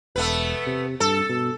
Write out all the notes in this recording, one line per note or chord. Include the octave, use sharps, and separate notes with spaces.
E1 A3 B3 B4
C3
G2 A4
B2